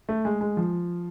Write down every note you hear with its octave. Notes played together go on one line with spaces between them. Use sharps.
A3
G#3
G#3
F3